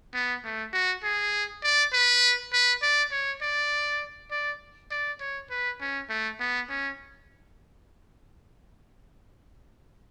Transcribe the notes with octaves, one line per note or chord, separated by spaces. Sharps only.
B3
A3
F#4
G#4
D5
B4
B4
D5
C#5
D5
D5
D5
C#5
B4
C#4
A3
B3
C#4